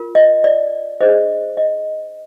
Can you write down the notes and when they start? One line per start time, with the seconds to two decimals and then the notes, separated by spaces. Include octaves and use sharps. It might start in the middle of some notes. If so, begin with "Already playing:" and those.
Already playing: F4 A#4
0.15 D#5
0.44 D5
1.01 D4 G#4 C5 D#5
1.57 D#5